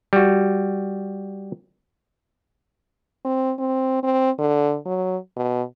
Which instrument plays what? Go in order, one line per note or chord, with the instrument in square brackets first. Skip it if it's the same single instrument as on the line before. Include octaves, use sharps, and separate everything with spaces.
[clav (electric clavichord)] G3 F#4
[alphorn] C4
C4
C4
D3
F#3
B2